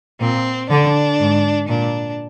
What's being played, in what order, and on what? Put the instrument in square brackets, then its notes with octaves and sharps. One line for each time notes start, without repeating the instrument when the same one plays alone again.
[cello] A#2 [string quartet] C4
[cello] D3 [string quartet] D4
[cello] G#2
[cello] A#2 [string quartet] D4